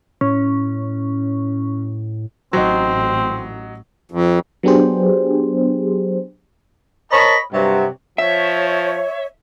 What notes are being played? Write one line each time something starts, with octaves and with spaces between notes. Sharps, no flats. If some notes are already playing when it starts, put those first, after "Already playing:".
A2 C#4
A1 F#3 C4 D#4
F2
F#3 B3 D4 G4 G#4 C5
A#4 C5 C#5 D#5 A5 B5
G2 C3 F#3
F3 C#5 E5